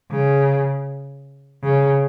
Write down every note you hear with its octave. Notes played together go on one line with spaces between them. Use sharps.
C#3
C#3